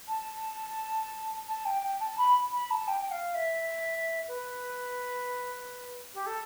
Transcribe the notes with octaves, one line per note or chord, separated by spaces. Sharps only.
A5
A5
G5
G5
A5
B5
B5
A5
G5
G5
F5
E5
B4
G4
A4